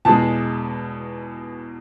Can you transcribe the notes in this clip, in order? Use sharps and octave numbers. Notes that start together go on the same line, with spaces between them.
E2 B2 G#3 A5